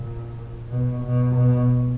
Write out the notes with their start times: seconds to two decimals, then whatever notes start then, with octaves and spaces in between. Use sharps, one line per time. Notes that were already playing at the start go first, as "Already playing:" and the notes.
Already playing: A#2
0.69 B2
1.02 B2
1.35 B2